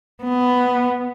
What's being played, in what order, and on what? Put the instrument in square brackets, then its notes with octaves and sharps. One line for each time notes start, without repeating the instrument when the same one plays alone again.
[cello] B3